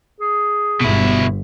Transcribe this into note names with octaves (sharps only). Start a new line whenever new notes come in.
G#4
G1 B2 E4